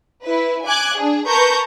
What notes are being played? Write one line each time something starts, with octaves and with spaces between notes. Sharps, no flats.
E4 B4
G#5 D6 F#6 G#6
D4 G#4
A#4 B4 A5 A#5 C#6 G6